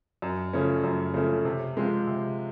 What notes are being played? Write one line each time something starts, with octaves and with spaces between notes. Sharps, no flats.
F#2
C#3 F3 A3 C#4
F#2
C#3 F3 A3 C#4
C3
F3 G#3 C4 F4
C3